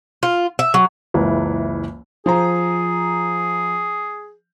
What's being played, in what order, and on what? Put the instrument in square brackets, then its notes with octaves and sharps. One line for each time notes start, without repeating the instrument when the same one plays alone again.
[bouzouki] F4
E5
F#3
[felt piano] F#1 C#2 E3
[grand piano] F3 C5 A#5 [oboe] G#4